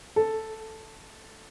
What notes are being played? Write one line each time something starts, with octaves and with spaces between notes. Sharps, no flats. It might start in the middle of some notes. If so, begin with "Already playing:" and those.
A4